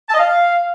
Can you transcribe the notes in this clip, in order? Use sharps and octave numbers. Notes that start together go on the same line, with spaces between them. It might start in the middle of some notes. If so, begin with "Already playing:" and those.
A5
D#5
F5